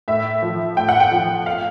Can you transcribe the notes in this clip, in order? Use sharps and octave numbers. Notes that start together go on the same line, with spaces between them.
A2 E5
F3
A2 G5
F#5
G5
F3 G5
F5